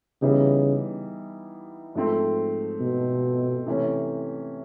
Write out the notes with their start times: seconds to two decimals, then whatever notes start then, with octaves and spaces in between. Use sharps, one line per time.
0.22 C#3 E3 G3 B3 D#4
1.95 G#2 F3 A3 C4
2.80 B2
3.66 C3 E3 A3 C#4